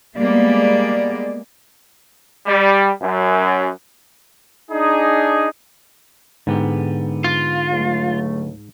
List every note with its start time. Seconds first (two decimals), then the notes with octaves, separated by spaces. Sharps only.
0.19 G3 G#3 A#3 B3 D5
2.47 G3
3.01 F#2
4.71 D4 D#4 G#4
6.47 G#2 D3 B3 G4
7.24 F4
7.70 C#2 F#3 A3